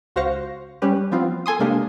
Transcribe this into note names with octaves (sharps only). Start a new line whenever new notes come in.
C#2 F#4 C5 F5 A#6 C#7
G3 C#4 G4 B4
F3 B3 C4 F4
A4 G#5 C6 D#6
C3 G#3 A#3 D4 G4